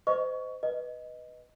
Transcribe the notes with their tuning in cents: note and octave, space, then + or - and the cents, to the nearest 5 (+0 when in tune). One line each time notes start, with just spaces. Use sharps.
C5 -30 D#5 +0 C#6 +20
B4 +0 D#5 +0